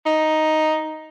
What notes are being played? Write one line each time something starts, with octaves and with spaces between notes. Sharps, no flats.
D#4